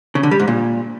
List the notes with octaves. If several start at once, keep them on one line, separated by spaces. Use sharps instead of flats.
C#3
D3
G3
G#2
A#2